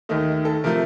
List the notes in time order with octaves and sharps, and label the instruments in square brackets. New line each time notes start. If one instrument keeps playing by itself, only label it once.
[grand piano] D#2 D#3 A3 D#4
A4
C3 F3 A3 A#4